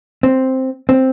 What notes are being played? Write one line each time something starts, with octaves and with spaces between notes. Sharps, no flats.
C4
C4